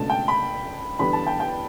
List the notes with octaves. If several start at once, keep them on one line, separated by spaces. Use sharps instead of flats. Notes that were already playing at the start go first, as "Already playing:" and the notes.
Already playing: C#2 B2 A3 D4 A5
G5
B5
E2 D3 G3 B3 D4 B5
A5
G5
G5